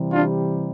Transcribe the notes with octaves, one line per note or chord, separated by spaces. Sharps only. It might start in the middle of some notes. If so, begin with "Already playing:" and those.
Already playing: C3 E3 G3
D4 F4